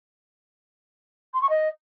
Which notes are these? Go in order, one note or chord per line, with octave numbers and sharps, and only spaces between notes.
C6
C#6
D#5